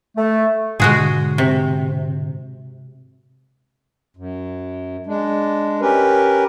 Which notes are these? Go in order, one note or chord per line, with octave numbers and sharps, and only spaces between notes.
A3
G#2 B2 D3 G#3 F#4 G#4
C3
F#2
G#3 D4
C#4 G4 A#4 B4